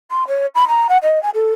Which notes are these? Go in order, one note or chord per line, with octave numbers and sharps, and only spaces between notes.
C6
C#5
B5
A#5
F#5
D#5
G#5
A4